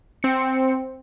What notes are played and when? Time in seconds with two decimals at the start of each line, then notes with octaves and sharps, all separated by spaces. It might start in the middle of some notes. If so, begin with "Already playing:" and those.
0.23 C4 C#7